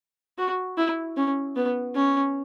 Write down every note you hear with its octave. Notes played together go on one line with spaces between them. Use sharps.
F#4
E4
C#4
B3
C#4